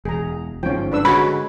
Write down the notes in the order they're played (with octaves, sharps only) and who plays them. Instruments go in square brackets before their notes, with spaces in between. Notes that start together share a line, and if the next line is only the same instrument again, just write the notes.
[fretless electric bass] E1 [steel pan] G#4 A#5
[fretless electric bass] G1 G#2 F3 [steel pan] C#4 G5
[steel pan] D4 B4 E6
[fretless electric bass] D3 G#3 [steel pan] F#4 C#5 [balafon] B5